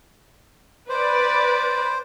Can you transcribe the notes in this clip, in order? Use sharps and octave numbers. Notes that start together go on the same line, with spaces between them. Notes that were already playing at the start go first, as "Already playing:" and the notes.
B4 C5 D5